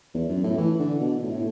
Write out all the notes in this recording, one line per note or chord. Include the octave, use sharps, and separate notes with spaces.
E2
F#2
A2
E3
D3
B2
A2
A2